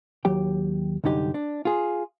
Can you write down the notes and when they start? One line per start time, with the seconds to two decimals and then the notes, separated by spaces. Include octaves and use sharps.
0.25 D#2 F#3 G4 G5
1.04 C2 F#2 D3 D#4 G4
1.34 D4
1.65 F4 G#4